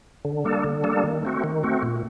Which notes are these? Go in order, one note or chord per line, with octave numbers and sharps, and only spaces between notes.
D3
G3 A#3 D4 A4
D3
G3 A#3 D4 A4
D#3
A3 C4 F#4
D#3
A3 C4 F#4
A#2